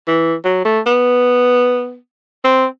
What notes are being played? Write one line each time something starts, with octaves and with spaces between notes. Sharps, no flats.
E3
F#3
A3
B3
C4